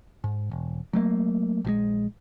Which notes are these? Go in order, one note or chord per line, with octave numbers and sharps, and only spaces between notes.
G#2
E1
F#3 A3 A#3
A#1 F3 G#3